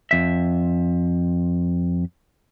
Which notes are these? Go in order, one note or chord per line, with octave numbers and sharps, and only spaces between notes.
F2 E5